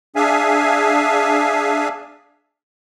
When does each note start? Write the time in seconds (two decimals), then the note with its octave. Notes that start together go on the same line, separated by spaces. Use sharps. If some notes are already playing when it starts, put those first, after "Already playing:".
0.16 D4 G#4 E5 F5 G#5